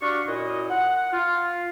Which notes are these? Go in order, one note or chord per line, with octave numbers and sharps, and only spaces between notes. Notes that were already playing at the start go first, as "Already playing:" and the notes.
D4 F#4 G4 F5 F#5 C#6
F#2 A#2 E4 D#5
F#5
F4